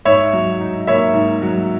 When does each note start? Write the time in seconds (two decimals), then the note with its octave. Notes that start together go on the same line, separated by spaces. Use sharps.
0.05 G#2 C#5 E5
0.33 F#3
0.61 D#4
0.87 A#3 C#5 E5
1.14 G#2
1.42 F#3